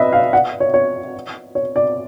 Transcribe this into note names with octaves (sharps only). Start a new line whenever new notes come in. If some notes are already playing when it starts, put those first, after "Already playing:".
Already playing: B4 D#5 E5
F5
F#5
C#5
C#5
C#5
D5